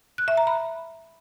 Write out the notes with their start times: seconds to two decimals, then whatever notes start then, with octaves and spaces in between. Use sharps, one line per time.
0.18 F#6
0.28 E5
0.37 A#5
0.47 B5